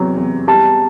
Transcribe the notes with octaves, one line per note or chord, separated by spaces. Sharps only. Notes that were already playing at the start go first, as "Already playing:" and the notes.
Already playing: E2 C3 F#3
E2
G3 A5